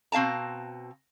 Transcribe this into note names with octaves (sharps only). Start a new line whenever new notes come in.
B2 C4 F5 A5 A#5